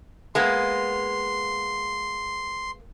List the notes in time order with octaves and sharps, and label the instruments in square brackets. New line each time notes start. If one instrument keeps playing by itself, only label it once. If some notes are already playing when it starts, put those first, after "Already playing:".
[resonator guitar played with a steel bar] G#3 A#3 B3 [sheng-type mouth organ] C6